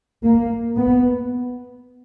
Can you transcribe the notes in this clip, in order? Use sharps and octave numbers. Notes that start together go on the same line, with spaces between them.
A#3
B3